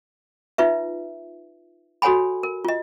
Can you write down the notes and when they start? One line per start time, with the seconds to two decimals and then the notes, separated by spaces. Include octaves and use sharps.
0.58 D#4 F4 B4 E5
2.02 F#4 A4 C#5 F#5 G#5 B5
2.43 A#4
2.65 F4 D#5